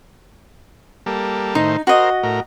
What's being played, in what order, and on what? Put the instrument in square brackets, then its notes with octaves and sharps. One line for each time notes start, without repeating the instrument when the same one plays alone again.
[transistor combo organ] G3 A#3 A4
[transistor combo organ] A2 D#3 C5 [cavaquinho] D#4
[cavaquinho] F#4 D#5 [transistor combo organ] A#4 C5
[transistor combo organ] A2 A#4